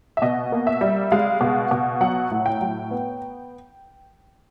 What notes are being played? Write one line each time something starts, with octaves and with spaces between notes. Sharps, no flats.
E5
B2 D#5
A#3
E5
G3
G#3 F5
B2
B2
F#3 F#5
A2
G5
F#3
B3